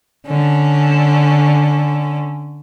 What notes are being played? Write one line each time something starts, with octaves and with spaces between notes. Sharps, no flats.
D3 C#4